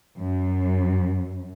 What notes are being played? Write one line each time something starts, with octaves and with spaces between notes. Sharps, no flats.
F#2